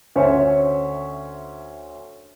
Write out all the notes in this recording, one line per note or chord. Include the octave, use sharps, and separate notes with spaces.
D2 C#4 C5 C#5 E5 C#6